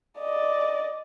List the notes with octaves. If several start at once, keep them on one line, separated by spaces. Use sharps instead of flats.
D5 D#5